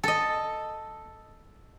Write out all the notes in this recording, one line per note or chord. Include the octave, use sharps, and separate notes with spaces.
A4 D#5